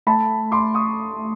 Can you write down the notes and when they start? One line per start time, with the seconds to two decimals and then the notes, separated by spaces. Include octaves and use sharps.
0.07 A3 A5 B5
0.52 C6 D6
0.74 C#6 D#6